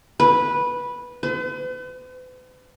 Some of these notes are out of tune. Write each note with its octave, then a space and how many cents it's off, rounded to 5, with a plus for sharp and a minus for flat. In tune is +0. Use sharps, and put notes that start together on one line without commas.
B4 -10
B4 +45